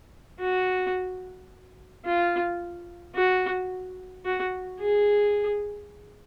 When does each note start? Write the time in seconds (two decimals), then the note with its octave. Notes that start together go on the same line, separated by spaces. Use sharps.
0.39 F#4
2.05 F4
3.15 F#4
4.25 F#4
4.80 G#4